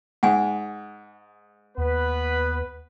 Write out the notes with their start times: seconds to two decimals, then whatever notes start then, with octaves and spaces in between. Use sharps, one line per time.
0.23 G#2 F#5 G#5
1.78 D#2 B3 B4